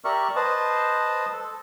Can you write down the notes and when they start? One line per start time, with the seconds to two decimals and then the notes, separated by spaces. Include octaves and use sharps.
0.04 G4 A#4 D5 E5 C#6
0.36 B4 C5 D#5 A5
1.33 A4